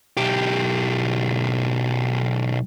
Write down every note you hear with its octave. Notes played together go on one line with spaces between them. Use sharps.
B1 G4